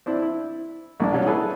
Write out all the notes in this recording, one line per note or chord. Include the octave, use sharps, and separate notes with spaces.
C4 D4 E4
E4
A#1 G#3 D4
B2 F#3 G3 C#4 G4
E4 G#4 A4 B4 G#5